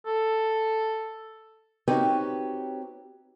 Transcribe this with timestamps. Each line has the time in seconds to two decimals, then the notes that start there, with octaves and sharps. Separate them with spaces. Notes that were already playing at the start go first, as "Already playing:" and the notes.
0.07 A4
1.88 C4 D#4 F#4 G4 B4 C#5